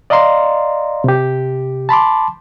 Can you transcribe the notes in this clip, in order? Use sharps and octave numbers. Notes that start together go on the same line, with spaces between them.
D5 D#5 F5 A#5 C6
C3 G4
A5 B5 C6 D6